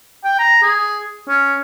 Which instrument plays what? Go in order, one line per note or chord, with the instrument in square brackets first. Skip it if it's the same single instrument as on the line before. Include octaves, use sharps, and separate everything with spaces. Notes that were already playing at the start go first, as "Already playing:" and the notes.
[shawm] G5
A#5
G#4
C#4